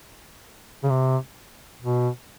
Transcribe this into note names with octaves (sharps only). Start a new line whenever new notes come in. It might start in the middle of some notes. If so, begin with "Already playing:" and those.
C#3
C3
B2